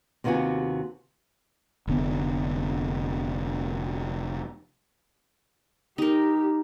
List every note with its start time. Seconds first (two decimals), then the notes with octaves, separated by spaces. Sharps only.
0.24 D#2 C3 B3 F4 F#4 G#5
1.87 F1 D3 B3
5.98 D#4 G4 A#4